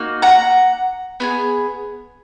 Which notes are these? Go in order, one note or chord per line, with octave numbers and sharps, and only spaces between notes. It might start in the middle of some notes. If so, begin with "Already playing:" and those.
Already playing: A#3 D#4 F#4
F#5 A#5
B3 F4 G#4